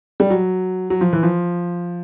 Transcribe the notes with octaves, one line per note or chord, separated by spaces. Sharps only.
G3
F#3
F#3
F3
E3
F3